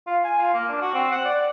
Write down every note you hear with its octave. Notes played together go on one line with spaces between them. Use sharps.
F4
G#5
F4
A#3
D4
F#4
C4
F#5
D5